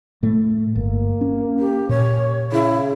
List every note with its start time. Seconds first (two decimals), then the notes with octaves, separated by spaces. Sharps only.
0.23 A2 A3
0.76 G1 A#3
1.21 C#4
1.59 G4
1.89 A#2 C#5
2.52 C#3 E4